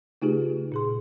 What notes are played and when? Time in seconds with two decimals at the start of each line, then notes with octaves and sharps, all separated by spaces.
0.22 C#3 A3 D#4 F4 G4 G#4
0.72 A#2 G#4 C6